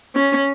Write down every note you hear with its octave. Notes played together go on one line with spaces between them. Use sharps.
C#4